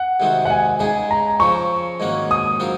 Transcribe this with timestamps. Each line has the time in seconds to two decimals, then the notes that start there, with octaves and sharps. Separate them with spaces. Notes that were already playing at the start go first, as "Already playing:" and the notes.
Already playing: F#5
0.20 C3 D#3 G#3 C4 F#4
0.45 F#5
0.50 G#5
0.79 C#3 G#3 D#4 G#4 G#5
1.11 A#5
1.40 C#3 F3 C4 C#6
2.00 G#2 D#3 A#3 C#4 F#4
2.31 D#6
2.60 C#3 F#3 C4 F4 A#4